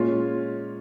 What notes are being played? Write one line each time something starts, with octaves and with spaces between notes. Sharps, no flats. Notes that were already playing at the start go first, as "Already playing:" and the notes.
Already playing: A#2 G#3 C#4 F4